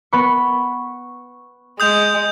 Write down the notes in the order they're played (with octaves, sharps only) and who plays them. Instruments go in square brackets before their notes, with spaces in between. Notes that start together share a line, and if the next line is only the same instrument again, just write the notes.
[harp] B3 B5 C#6
[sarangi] G#3 [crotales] D#6 G6 F7